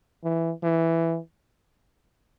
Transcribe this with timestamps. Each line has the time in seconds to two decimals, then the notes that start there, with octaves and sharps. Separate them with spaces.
0.24 E3
0.63 E3